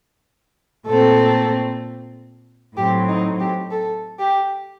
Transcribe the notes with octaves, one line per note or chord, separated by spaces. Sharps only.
A#2 A3 C4 A4
A2 F#3 C4 G4
D#4
G4
A4
G4